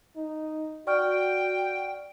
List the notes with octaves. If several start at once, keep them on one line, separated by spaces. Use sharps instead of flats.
D#4
F#4 D5 G5 C#6 F6